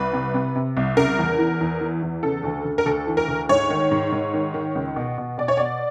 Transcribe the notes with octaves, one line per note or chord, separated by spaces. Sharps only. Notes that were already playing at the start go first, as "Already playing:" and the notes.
Already playing: C2 B4
C3
C3
C3
C2
C#3 A#4
E2
E3
E2
E3
E2
C#3 A4
D2
D2
A#4
D2 A4
E3
A#4
D2
G#2 C#5
D#3
G#2
G#2
D#3
D#3
C#2
B2
B2
B2 D5
C#5
B2 D5